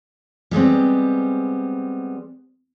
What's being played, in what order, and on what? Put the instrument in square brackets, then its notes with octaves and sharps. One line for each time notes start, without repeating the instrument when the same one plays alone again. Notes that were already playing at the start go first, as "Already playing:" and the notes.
[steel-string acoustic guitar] G3 G#3 B3 C4